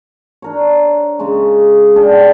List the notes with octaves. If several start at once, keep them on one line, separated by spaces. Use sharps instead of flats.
D4 A#4 C#5
C#3 G#3 C#4
D4 G#4 G5